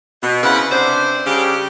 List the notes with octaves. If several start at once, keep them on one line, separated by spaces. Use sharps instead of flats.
B2
C#3 C4 E4 B4 F#5
C3 D4 C5
C#3 G3 D4 G4